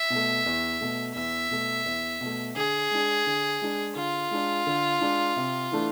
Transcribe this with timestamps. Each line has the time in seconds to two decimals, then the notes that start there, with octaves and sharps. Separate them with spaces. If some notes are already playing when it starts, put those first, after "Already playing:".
Already playing: E5
0.10 B2
0.15 A3
0.46 E2
0.81 B2 A3
1.15 E2 E5
1.51 B2 A3
1.85 E2
2.21 B2 A3
2.56 D3 G#4
2.91 G#3 D4
3.27 D3
3.62 G#3 D4
3.96 D3 F4
4.31 G#3 D4
4.67 D3
5.01 G#3 D4
5.36 C3
5.71 E3 A3 D4